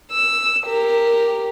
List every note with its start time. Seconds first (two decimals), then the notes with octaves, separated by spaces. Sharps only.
0.12 E6
0.67 G4 A#4